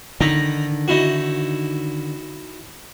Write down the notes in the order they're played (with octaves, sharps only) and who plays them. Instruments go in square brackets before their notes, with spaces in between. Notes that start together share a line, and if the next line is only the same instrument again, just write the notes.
[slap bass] D3 D#3 [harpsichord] D#4 A#5 B5
[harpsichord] D#4 E4 F#4